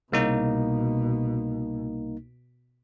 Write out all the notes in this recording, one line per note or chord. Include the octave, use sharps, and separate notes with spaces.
C2 B2 A#3 D#4